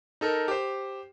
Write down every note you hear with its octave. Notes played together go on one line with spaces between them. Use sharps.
D#4 A4 A#4
G4 C5